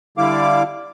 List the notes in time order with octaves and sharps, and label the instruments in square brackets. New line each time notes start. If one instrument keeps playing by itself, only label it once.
[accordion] D3 G3 E4 F5 D6